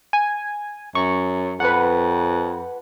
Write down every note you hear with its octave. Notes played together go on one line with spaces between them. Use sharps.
G#5
F#2 C#6
F2 B4 F#5